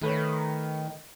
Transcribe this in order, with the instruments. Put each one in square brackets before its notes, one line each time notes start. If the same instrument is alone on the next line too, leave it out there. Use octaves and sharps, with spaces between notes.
[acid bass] D#3 [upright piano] A3 B4 C#5